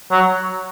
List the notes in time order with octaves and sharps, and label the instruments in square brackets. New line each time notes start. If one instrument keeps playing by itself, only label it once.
[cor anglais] F#3